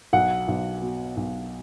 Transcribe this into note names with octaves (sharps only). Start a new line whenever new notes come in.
B1 F#5
B1
B2
B1